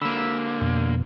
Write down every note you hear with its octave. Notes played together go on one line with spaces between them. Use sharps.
D3 A#3 B5 E6
F2 B2